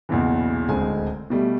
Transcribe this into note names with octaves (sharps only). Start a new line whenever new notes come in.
B1 E2 A#2 C#3 E3
D1 C#2 D3 G#3 C4 G#5
B2 G3 A3